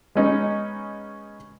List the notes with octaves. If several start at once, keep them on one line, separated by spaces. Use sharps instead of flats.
G#3 B3 C#4 D#4